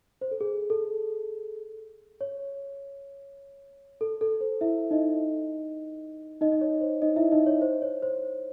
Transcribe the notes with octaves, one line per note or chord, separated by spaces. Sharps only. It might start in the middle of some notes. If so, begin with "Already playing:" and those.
C5
A4
G#4
A4
C#5
A4
A4
C5
E4 E5
D#4 D#5
D#4 D#5
D#5
C#5
C5
D#4 D#5
E4 E5
D#4 D#5
C#5
C5
C#5
C5